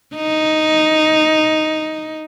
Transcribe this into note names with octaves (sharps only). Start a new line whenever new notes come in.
D#4